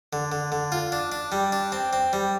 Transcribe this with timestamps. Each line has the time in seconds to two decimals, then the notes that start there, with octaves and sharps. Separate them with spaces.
0.13 D3
0.32 D3
0.52 D3
0.72 F4
0.92 D4
1.12 D4
1.32 G3
1.52 D4
1.72 C4
1.93 C4
2.13 G3